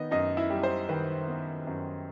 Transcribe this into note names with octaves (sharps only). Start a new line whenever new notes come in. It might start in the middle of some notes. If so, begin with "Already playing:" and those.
Already playing: D#3 B3 D#4 D#5
F#2 D#4 D#5
E4 E5
G3
C5
D#3 B4
B3
F#2